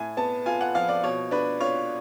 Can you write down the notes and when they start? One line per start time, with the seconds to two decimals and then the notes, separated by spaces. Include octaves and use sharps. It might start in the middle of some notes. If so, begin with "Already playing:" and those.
Already playing: A2 G#5
0.17 B3 A5
0.46 F4 G#5
0.61 F#5
0.75 F3 F5
0.89 D5
1.03 B2 C#5
1.31 D4 B4
1.60 F4 C#5